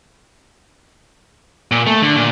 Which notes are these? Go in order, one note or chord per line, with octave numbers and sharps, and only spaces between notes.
A#2
A3
D3
A#2